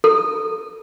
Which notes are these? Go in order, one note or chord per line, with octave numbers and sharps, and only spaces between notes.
A4